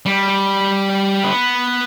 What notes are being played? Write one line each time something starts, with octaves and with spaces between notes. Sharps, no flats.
G3
B3